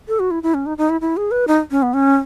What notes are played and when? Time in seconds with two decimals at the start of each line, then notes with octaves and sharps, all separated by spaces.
0.08 A4
0.19 F#4
0.31 E4
0.43 E4
0.54 C#4
0.66 D#4
0.78 D#4
0.89 E4
1.01 E4
1.17 G#4
1.31 B4
1.48 D#4
1.71 C#4
1.82 B3
1.94 C#4